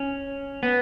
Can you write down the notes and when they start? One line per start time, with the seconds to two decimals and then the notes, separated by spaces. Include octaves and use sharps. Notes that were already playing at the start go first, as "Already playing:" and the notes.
Already playing: C#4
0.63 B3